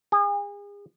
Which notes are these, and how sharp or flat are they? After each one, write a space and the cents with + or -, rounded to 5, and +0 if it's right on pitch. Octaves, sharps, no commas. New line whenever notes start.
G#4 -35